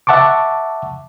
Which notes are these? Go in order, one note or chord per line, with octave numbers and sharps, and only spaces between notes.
E5 F#5 A5 C#6 D6